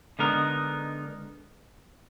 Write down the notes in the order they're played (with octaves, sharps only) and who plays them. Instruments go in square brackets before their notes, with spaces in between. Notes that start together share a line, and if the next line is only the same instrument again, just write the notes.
[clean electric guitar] D3 G#3 B3 D#4 A#4